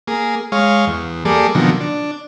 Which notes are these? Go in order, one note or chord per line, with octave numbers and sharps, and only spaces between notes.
A#3 G#4
G#3 C#5 F5
E2
G3 A#3 G#4 A4 D5
B2 D3 D#3 F3 F#3 A#3
D4